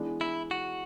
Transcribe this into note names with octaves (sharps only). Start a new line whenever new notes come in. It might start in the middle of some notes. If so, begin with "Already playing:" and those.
Already playing: E3 G#3 B3 D4
E4
F#4